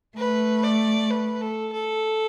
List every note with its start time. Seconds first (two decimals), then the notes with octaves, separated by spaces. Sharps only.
0.17 A3 B4
0.64 D5
1.11 B4
1.41 A4
1.72 A4